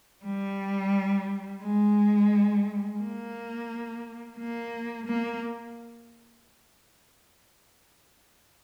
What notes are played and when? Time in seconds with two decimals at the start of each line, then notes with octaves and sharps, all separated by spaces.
0.25 G3
1.62 G#3
2.99 A#3
4.37 A#3
5.06 A#3